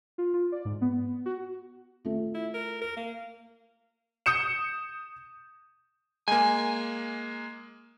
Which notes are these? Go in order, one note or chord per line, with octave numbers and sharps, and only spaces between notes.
F4
F4
D5
G#2
B3
F#4
A3 F4
E4
A#4
A#4
A#3
D#6 G6 C#7 E7
G#3 A#3 G#5